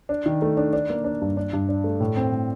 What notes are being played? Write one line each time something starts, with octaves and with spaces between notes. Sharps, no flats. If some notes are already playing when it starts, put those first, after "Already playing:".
D4
D#3
A3
D4
D4
A#3
D4
G2
D4
G2
D4
A3
A2
C4
A2